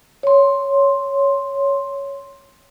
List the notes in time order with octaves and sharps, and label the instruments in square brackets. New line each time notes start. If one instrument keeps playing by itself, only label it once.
[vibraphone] C#5 C6